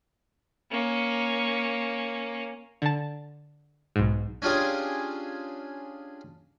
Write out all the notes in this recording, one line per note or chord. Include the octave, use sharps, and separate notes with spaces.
A#3 C#4
D3 A5
B1 G#2
C#4 D4 F4 G4 G#4